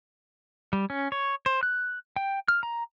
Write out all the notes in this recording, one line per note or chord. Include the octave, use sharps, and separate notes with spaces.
G3
C#4
C#5
C5
F#6
G5
F6
A#5